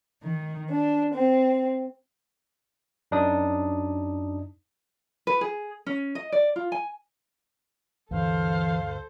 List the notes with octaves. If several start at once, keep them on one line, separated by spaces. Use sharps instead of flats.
D#3
D4
C4
F#2 D4 D#4 D#6
B4
G#4
C#4
D#5
D5
F4
G#5
D2 G2 D3 E3 A4 C5 F5